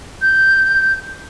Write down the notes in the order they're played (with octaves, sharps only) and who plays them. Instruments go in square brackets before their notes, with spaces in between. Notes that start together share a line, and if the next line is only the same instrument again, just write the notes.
[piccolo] G6